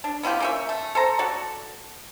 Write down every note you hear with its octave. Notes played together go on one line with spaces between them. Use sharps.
D4
B3 E4 F4 G4
A#3 C#4 E5
A3
A4 C5 A#5
F#4 A4 D5